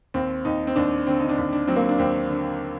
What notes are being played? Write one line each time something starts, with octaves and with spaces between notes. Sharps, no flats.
D#2 C4
D#2 D#4
C4
D#2 D4
D3 C4
D#4
D4
D#2
D4
F#3 C4
A#3
D4
D#2 C4
D3